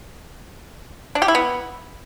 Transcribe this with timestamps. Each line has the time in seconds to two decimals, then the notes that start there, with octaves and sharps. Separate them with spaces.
1.15 D4
1.22 G4
1.28 E4
1.35 B3